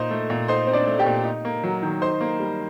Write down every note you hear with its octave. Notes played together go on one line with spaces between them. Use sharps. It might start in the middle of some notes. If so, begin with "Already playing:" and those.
Already playing: A#2 D#4 C5 C6
A3
A#2
D#4 C5 C6
C4
D4 D5
A3
G4 G5
A#2
D#4
A#3
F#3
D#3
D#4 C5 C6
A#3
G3